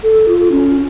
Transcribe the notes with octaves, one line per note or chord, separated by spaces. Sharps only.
A4
F4
C#4